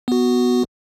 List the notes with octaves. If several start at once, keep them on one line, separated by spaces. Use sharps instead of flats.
B3 F#4